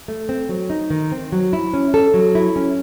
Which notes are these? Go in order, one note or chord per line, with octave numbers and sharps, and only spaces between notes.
A3
C4
F#3
D#4
D#3
C4
F#3
E4
C#4
A4
F#3
E4
C#4